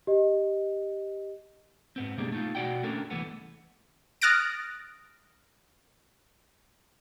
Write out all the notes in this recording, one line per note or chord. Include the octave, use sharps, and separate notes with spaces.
G4 D#5
G#2 B3 C4
B2 D3 G3 G#3 A#3
A3 D#4 F4
B2 F#4 D5 F#5 G5
A3 A#3 C#4 D4 A4 A#4
C2 F#2 E3 A3 B3
D#6 F6 F#6 A6 A#6 D7